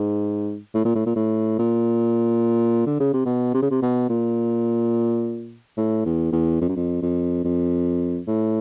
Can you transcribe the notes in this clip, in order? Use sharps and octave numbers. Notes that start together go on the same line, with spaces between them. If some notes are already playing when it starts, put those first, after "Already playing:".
Already playing: G#2
A2
A#2
A2
A#2
A2
A#2
D3
C#3
C3
B2
C3
C#3
C3
B2
A#2
A2
E2
E2
F2
F#2
F2
F2
F2
A2